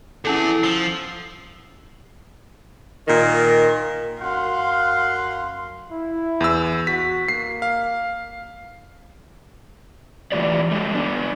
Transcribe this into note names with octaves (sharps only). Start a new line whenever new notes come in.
E2 C#4 E4 G#4 A4
F3 E6
A#2 D#3
F#2 F5 F#5 C6
E4
E2 E6
F#4 B6
A#3 C7
F5
E3 A3 F4 G4 D5
F#3 G#3 A3
B3 D4